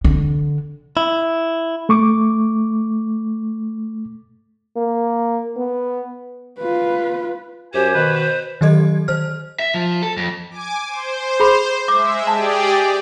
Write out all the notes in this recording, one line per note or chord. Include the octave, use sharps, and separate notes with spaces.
D3
E4
A3 C#6 D6
A#3
B3
F4 B4
F#2 G4 C5 G#5
B2 D#3 B4
D#3 F#3 G4 A4 D#5 G#6
D#3 C5 F6
E5
F3
A4
F2
G#5 D6
C5
G#4 B5
G#3 E5 D6
G4 G#4 D5 A5